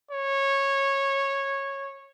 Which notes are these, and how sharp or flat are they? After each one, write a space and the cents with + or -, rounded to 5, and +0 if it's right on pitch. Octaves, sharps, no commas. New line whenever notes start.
C#5 -15